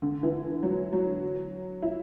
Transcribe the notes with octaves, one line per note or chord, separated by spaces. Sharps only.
D3
E3
F#3
F#3
E4